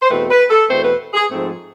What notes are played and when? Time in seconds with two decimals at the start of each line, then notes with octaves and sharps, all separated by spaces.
0.02 C5
0.09 E2 B2 A3 C4 B4
0.29 B4
0.49 A4
0.69 E2 B2 A3 C4 C5
0.84 B4
1.14 G#4
1.29 G#2 F3 A3 C4